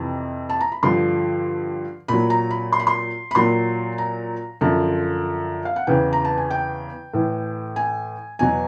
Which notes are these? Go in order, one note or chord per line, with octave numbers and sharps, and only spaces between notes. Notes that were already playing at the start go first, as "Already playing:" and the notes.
Already playing: F2 C3 E3
A5
A#5
B5
G2 D3 F3 C6
A#2 F#3 B5
A#5
B5
C6
B5
C6
B5
A#2 F#3 C6
A#5
F#2 D3 F3 A5
F5
F#5
E2 C#3 E3 G5
A#5
A5
G#5
G5
A2 E3
G#5
E2 B2 F#3 G#5